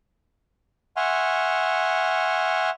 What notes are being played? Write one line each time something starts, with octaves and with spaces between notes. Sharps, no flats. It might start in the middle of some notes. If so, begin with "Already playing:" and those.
E5 F#5 G#5 C6 C#6 F6